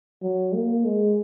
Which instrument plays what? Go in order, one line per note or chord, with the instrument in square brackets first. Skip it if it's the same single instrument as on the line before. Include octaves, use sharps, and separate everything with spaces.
[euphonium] F#3
A#3
G#3